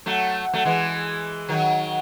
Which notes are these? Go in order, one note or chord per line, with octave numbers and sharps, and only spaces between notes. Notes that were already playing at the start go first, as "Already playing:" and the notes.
F#3 A3
F#3 A3
E3 G#3
D#3 F#3